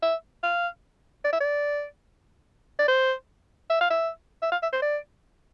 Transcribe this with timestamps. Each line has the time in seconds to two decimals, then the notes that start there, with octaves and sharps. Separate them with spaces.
0.02 E5
0.43 F5
1.25 D5
1.33 E5
1.40 D5
2.79 D5
2.88 C5
3.70 E5
3.81 F5
3.90 E5
4.42 E5
4.52 F5
4.62 E5
4.73 C5
4.82 D5